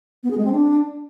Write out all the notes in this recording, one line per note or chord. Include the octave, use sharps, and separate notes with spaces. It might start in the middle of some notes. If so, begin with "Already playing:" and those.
B3
G#4
G#3
C4
D4